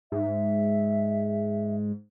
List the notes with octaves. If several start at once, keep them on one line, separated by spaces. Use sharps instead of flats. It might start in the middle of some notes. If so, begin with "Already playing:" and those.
G#2 E5